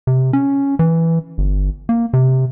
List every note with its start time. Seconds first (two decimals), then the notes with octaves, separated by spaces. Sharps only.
0.07 C3
0.33 C#4
0.79 E3
1.38 G1
1.89 A#3
2.13 C3